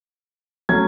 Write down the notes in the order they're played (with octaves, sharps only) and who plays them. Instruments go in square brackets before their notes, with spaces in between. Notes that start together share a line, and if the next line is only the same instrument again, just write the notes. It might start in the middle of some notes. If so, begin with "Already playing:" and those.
[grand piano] F#3 A3 C#4 G#6